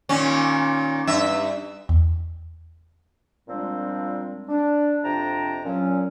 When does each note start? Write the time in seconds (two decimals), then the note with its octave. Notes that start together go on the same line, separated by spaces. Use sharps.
0.09 A#2 D#3 C#4
1.07 G2 E5
1.89 E2
3.49 A#2 F3 G3 G#3 C4 D4
4.49 D4
5.04 F2 C3 D4 G5 A5 A#5
5.65 A#2 F#3 C#4